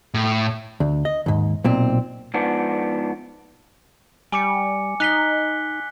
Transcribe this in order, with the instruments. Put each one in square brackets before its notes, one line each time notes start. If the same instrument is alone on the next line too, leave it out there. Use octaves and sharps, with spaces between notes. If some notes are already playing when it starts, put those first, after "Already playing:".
[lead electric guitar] A2
[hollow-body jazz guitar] D2
D#5
D#2 G#2
B1 A#2 C4
[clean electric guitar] G#2 F3 B3 D4
[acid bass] G3 [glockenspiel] G#5 D6 C#7
[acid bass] D#4 [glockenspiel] F#6 B6 G7